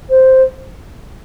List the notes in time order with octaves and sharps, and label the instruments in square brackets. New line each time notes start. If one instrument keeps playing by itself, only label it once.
[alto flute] C5